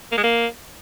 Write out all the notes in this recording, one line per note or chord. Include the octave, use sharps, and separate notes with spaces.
A#3
G#3
A#3